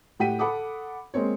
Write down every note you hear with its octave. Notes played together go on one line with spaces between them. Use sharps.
A2 G4 F#5 G5 B6 D#7
A4 F#5 B5 D6 D#6
G#3 A#3 C4 C#5